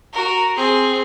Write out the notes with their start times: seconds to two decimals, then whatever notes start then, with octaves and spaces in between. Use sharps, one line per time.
0.13 F#4 A#4
0.56 C4 G#4